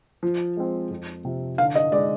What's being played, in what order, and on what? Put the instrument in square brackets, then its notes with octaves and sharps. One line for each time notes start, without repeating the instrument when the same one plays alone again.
[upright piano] F3
G#3 C4
F2
C3 F3
[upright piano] D3 [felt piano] F5
[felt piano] D#5
[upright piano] G#3 D#4 [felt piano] D5